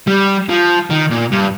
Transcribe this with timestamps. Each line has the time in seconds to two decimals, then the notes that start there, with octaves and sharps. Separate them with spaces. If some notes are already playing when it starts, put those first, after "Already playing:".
0.08 G3
0.49 F3
0.90 D#3
1.10 A#2
1.31 G2